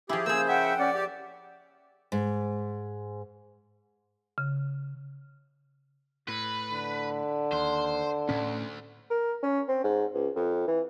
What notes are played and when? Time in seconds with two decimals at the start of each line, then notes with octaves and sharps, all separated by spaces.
0.09 F3 E4 G4 G#4
0.26 C#3 A#3 G#4 C5 E6
0.48 E5 F#5 G5
0.79 C#4 D5
0.94 G4 D6
2.12 G#2
4.38 C#3
6.28 A2 B4
6.72 D3
7.52 D#2 C5
8.29 D2 A2 C#4
9.10 A#4
9.43 C#4
9.68 C4
9.84 G#2
10.14 C#2
10.36 F2
10.68 E3